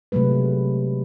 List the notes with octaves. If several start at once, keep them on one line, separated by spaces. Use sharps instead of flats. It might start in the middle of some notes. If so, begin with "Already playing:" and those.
C3 F#3 G#3 A3 B4